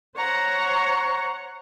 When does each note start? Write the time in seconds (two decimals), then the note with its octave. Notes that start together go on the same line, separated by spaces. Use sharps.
0.16 C5 C#5 F#5 A#5